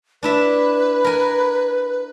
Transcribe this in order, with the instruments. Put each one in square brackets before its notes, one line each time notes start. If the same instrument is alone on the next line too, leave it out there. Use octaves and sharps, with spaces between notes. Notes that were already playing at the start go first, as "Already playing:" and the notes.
[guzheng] D4 E4 E5 [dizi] B4
[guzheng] A#4 G#5